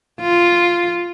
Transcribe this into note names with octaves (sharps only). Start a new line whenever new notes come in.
F4